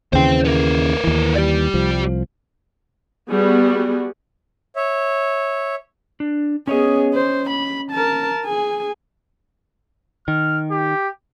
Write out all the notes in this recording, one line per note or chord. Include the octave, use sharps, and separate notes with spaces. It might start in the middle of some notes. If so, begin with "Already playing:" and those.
D#2 C#3 E3 C5 G5
B3 A#4
D#2 E3
G4 D5
C2 F3
G3 B3 F#4 G#4
C#5 E5
D4
B3 C#4 G#4 C#5 D#5
C5
B5
A#4 A5
G#4 G#5
D#3 F6
G4